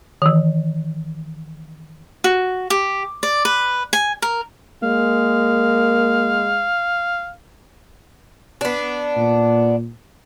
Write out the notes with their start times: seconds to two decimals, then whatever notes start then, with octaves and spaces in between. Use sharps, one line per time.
0.22 D#3 E3
2.24 F#4
2.70 G4
3.23 D5
3.45 B4
3.93 G#5
4.22 A#4
4.83 G#3 A#3 F5
8.61 B3 D4
9.17 A#2